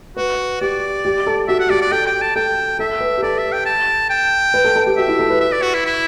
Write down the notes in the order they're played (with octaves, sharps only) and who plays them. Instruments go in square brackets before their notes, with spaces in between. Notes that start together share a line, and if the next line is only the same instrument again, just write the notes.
[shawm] F#4 [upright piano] B4
[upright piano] G4 [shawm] D5
[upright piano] G4
A4
[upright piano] F#4 [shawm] E5
[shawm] F#5
[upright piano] G4 [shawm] D5
[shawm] D5
[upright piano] A4 [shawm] G5
[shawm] G5
A5
[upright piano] A4 [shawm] G5
[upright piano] A4 [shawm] E5
[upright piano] B4
G4
[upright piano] A4 [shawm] D5
[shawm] E5
G5
A5
G5
[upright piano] B4
A4
A4
G4
[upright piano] F#4 [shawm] E5
[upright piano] E4
A4
B4
[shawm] E5
D5
F#4
E4
E4